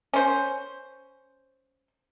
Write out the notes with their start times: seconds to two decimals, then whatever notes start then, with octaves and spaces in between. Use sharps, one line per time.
0.14 C#4 C5